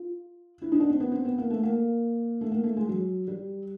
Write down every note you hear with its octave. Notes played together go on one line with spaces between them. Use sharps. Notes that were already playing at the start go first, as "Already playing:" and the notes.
Already playing: F4
E4
D#4
D4
C4
B3
C4
B3
A#3
A3
A#3
A3
A#3
A3
G#3
F#3
G3